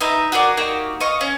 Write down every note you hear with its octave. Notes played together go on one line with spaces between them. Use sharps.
D#4 B4 E5 A#5
F#4 G#4 A#4 D5
A#3 D#4 F#4 G4
D#5 F5 C#6
C#4